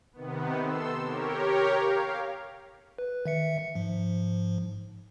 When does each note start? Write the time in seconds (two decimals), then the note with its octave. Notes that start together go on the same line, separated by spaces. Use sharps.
0.13 C3 D#3 B3
0.61 A4 C6 E6
0.98 G4 A#4 C#5
1.74 F5
2.99 B4
3.26 D#3 E5 C#7
3.75 G#2 F3